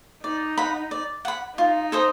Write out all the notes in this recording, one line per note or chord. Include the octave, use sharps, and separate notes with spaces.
D#4 D5
F#5 B5
D5
F#5 B5
D#4 F4
A4 C5 D#5